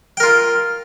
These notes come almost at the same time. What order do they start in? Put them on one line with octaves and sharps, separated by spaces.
G5 A#4 F4